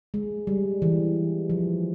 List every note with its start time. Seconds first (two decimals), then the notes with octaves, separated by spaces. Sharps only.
0.14 G#3
0.47 G3
0.82 E3
1.50 F3